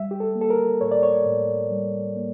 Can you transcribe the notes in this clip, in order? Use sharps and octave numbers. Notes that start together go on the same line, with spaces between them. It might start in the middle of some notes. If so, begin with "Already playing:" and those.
Already playing: G3 E5
G4
A4
A#3
A4
A#4
A2 C#5
D5
C#5
A2
G3
A#3